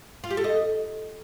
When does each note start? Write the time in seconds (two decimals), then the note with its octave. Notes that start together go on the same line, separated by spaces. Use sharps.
0.24 F4
0.30 G4
0.37 A4
0.44 D#5